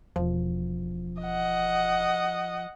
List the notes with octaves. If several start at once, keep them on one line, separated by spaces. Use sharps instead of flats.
E1 F3
D#5 F#5